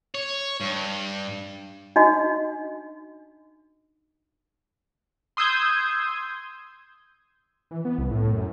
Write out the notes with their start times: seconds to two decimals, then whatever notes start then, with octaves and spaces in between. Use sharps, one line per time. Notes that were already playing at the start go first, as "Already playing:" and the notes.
0.15 C#5
0.60 G2
1.96 D4 D#4 F#4 D#5
5.37 C6 D#6 E6 G6 G#6
7.71 E3
7.85 B3
7.98 C2
8.11 A2
8.33 F#2